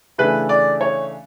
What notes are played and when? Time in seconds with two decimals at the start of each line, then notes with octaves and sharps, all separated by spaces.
0.18 C#3 E3 A3 D4 B4
0.49 D5
0.81 C#5